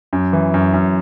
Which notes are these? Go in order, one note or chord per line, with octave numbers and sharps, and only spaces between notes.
F#2
E3
F#2
F#2